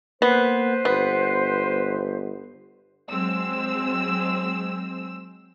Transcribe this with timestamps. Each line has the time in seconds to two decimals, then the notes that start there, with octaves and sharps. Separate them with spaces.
0.22 A#3 B3 B4 C5
0.85 G1 B3
3.10 F#3 G#3 C4 E6